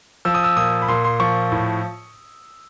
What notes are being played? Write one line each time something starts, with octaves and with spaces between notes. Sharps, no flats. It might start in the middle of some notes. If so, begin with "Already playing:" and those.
F3 E6
D#6
E6
A#2 D#6
B5
A#2 C6
C6
F3 C#6
A2